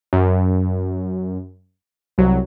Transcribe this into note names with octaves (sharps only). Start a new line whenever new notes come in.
F#2
C2 F#3